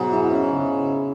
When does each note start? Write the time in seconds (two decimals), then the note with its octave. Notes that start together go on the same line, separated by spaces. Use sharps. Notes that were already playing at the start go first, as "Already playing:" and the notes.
Already playing: G#2 B2 F#3 B3
0.12 E4
0.31 C#4
0.51 C#3